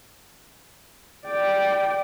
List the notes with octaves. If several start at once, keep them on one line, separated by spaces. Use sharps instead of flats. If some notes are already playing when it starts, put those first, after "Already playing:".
D5 G5